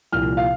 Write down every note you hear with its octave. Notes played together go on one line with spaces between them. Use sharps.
C2 A#2 F3 F6
F5